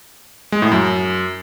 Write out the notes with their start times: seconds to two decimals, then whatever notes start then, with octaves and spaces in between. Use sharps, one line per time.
0.52 G#3
0.62 A2
0.72 F#2